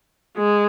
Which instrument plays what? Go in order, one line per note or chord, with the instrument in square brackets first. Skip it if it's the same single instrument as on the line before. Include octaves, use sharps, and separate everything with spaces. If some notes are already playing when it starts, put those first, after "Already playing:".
[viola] G#3